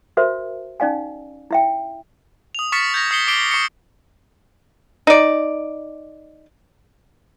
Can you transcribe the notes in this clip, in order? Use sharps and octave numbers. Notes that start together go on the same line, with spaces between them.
F#4 A#4 C5 E5
C#4 D#4 D5 F5 G#5
E4 E5 G5
D#6 F7
C#6 F6 A6 B6 C#7
G6 G#6 A#6 F7
D#6 C7 C#7 G7
D6 C7 D7 G7
C#6 C7 C#7 G7
D#4 D5